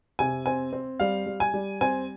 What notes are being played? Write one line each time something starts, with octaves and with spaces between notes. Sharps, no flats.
C3 G#5
C4 G#5
C4
G3 F5
G3
G#5
G3
C4 G#5